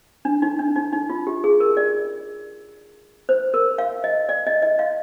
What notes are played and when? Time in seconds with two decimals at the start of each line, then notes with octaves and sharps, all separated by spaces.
0.25 D4
0.42 D#4
0.59 D4
0.76 D#4
0.93 D#4
1.09 F4
1.27 G4
1.44 G#4
1.60 A#4
1.77 D5
3.29 C5
3.54 A#4
3.78 F5
4.04 D#5
4.29 D5
4.46 D#5
4.62 D#5
4.79 F5